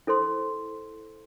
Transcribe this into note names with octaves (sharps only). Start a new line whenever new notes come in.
E4 A4 C5 C6